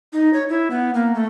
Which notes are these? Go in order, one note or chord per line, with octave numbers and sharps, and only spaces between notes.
D#4
C#5
E4
B3
A#3
A3